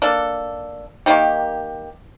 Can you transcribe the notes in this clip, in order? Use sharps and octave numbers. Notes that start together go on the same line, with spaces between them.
A#3 D4 A4
D#3 A#3 D#4 G4